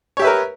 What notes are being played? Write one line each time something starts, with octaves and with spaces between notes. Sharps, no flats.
G4 A#4 B4 C#5 E5